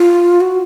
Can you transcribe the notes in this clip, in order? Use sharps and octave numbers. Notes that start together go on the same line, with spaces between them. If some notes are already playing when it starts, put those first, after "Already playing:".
Already playing: F4
F#4